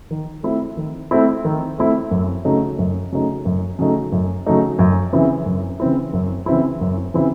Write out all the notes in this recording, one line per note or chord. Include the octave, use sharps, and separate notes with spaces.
D#3
A3 C4 E4
D#3
A3 C4 E4
D#3
A3 C4 E4
F#2
C#3 F#3 A3 D#4
F#2
C#3 F#3 A3 D#4
F#2
C#3 F#3 A3 D#4
F#2
C#3 F#3 A3 D#4
F#2
C#3 E3 C4 E4
F#2
C#3 E3 C4 E4
F#2
C#3 E3 C4 E4
F#2
C#3 E3 C4 E4